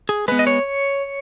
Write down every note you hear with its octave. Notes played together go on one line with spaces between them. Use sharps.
G#4
G#3 B3 B4
D#5
C#5